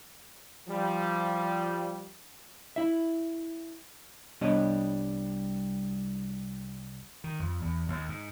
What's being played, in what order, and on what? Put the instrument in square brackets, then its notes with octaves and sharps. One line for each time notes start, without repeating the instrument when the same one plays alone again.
[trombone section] F3 G3
[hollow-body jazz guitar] E4 E5
C2 G3 B3 D4 C#5 D#5
[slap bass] D#3
F2
E2
D#2
G#2